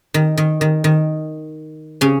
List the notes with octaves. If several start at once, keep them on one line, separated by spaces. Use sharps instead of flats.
D#3
D#3
D#3
D#3
C#3 C#4